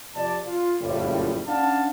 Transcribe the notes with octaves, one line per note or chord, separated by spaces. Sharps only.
F2 C3 D5 A5
F4
F#1 F2 A2 G3
C#4 D4 D5 F5 F#5 A5